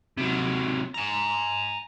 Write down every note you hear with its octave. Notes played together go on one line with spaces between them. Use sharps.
C3 F#3
G#5 A#5